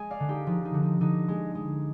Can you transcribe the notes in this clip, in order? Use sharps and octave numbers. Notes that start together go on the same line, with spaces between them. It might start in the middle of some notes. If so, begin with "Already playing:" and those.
Already playing: G#3 G#5
D5 F5
D3
D#4 G4
F3 D#4
D#4
D3
D#4
D3 D#4
G#3
G#3